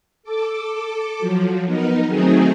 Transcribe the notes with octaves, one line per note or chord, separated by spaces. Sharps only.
A4 D6
F3 F#3
B3 D#4 A#4
D#3 F#3 A3 C4 D#4 G#4